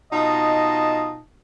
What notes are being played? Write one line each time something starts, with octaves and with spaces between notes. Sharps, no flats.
B2 D#4 F4 D#5 A5